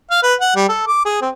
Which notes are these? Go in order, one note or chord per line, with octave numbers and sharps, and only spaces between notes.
F5
B4
F#5
G3
A4
D6
G#4
C4